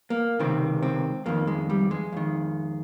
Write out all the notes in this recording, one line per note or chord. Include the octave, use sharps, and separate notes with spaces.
A#3
C#2 C3 D#3 C4
C4
F2 D#3 A#3
G#3
G3
G#3
F2 D#3